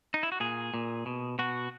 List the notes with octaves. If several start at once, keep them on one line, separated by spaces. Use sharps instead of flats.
D#4
E4
F#4
A#2 G#4
A#2
B2
B2 F#4